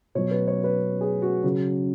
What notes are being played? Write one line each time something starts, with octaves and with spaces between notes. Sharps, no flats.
B2 F#3 C#5
B4
C#5
B4
G#4
F#4
C#3 F#3